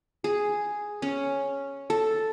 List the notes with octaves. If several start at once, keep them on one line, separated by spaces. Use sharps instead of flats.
G#4
C#4
A4